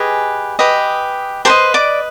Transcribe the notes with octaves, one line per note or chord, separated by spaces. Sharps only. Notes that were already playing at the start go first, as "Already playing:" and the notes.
Already playing: G4 G#4 B4 D#5 G#5
G4 B4 D#5
G4 B4 C5 D#5 C6
D5 D6